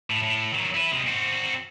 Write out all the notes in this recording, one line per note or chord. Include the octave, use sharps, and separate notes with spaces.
A2
A2
D#3 F#3
E4 B4
C3 G#3
C4 F#4